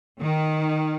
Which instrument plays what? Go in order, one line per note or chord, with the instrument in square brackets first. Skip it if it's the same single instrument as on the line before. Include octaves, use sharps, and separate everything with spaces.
[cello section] D#3